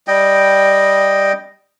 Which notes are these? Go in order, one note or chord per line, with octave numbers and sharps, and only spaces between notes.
G3 D#5 G5